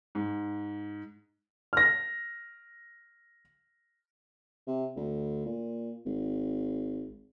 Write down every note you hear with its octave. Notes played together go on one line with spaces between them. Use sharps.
G#2
F6 A#6
C3
D2
A#2
G#1